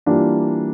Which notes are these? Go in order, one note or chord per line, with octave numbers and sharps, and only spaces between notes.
E3 G3 A#3 D4 F4